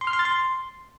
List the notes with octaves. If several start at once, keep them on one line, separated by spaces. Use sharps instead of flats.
C6
F6
C6
A6
C6